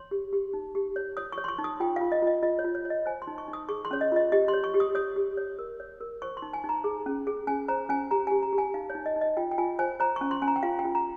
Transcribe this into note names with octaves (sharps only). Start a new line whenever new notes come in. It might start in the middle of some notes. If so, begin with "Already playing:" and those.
Already playing: C#5 C6
G4
G4
D#4
G4
C#5
C#5 D#6
C#6
C#5
C6
C#6
D#4
D#6
F4 G5
F4 F5
D#5
F4 D#5
F4 D#5
C#5
F4
C#5
C#5
D#5
C5 G#5
C6
D#4
C#6
D#4
D#6
G#4 C#6
C6
C#4 C#5
D#5
F4 D#5
G4 D#5
C6
C#5
C#6
G4
D#6
C#5 D#6
G4
C#5
A#4
C#5
A#4
C5 C#6
C6
D#4
G#5
D#4
A#5
G#4
C#4
G#4
C#4 G#5
C5 A#5
C#4 G#5
G4 A#5
G4 G#5
A#5
G4
G#5
D#4 F5
C#5
D#4
D#5
D#4
D#5
F4 G5
G5
F4 G#5
C5 G#5
C5 A#5
C#4 C#6
C6
C#4 G#5
A#5
G5
F4 F5
G5
F4
A#5